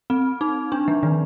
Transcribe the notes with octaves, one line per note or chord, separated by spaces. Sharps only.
C4
D#4
D4
F3
D#3